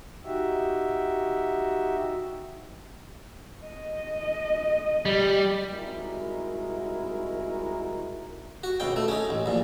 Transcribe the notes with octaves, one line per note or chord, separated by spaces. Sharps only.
D#4 F#4 G4 E5
D#5
G3
C2 G#3 D#4 E4 F#4 A#4
F#4
C#2 B2 G5
A3
C#4 D#4
A1
A#1 A#2